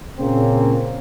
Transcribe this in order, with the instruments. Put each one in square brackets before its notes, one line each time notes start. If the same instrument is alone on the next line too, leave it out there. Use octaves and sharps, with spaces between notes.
[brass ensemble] A#2 C#3 A#3 C4 C#4